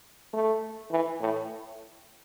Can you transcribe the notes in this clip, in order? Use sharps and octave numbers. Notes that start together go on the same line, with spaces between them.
A3
E3
A2